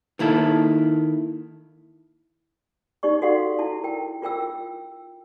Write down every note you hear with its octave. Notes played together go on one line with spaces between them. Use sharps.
D#3 A#3 E4 A4
D#4 G4 D5 C#6
F#4 A4 D5 F5 F#5 C6
E4 A5
A#4 G5
F4 A#4 G5 E6